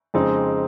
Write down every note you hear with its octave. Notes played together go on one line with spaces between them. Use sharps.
F2 C#3 G#3 C4 D#4